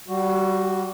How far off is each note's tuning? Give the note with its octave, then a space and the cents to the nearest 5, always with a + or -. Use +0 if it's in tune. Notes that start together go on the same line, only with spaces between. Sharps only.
G3 -25 F#4 +0